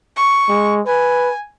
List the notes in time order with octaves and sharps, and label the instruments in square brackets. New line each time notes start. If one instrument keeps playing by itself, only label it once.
[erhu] C#6
[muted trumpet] G#3
[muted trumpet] B4 [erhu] G#5